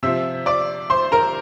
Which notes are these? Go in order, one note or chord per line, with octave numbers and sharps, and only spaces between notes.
C3 F3 C4 E5 E6
D5 D6
C5 C6
A#4 A#5